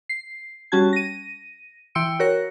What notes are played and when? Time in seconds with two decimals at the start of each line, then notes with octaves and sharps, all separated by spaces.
0.09 C7
0.72 G3 C#4 F#4 A5 G#6
0.93 A#6 D#7
1.95 E3 G5 C6 E6 C#7 D7
2.19 F#4 A#4 C#5 F#6 A#6 C#7